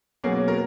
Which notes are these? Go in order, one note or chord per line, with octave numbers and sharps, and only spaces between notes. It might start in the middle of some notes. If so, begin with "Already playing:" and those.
B2 F#3 A#3 C#4 G#4
A#4